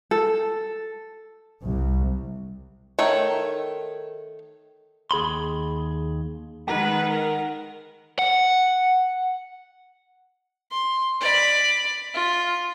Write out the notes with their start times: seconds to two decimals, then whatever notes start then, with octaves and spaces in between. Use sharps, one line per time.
0.11 A4
1.64 C2
2.99 D#3 A3 C#5
5.11 D#2 G#4 B5 C6
6.67 D#3 G#3 B4 F#5 A#5
7.09 A#4
8.19 F#5
10.71 C6
11.21 D5 B5
12.14 F4